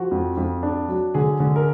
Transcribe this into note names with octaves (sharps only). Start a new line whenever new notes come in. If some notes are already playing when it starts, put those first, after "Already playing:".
Already playing: F3 F#4
F2
F2
D4
F#3
D3 G#4
D3
A#4